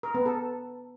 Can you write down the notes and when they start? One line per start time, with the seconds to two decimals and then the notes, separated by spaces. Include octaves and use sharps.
0.03 A#4
0.14 B3
0.26 A4